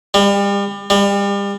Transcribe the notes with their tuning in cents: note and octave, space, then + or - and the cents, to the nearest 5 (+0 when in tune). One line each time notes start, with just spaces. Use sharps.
G3 +35
G3 +35